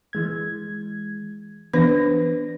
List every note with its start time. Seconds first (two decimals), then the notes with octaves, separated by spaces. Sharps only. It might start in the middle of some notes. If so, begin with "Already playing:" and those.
0.13 E3 G#3 G#6
1.73 E3 B3 D4 B4 A#6